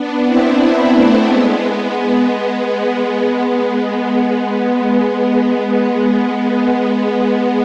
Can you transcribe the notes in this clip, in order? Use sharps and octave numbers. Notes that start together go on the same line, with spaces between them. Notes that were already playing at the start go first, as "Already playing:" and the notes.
Already playing: B3 D4
C4 E4
B3 D4
A3 C4
G#3 B3
G#3 B3